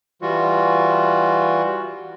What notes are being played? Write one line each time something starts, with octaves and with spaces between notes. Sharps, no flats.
E3 G3 F4 F#4